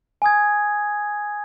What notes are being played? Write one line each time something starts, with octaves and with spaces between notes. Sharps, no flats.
G#5 D#6 G#6